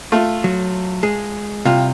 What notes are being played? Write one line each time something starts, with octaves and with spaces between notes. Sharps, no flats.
A3 F4
F#3
G#3 G#4
C2 C3 F4